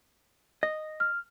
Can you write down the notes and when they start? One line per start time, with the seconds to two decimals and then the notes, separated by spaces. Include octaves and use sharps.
0.63 D#5
1.00 F6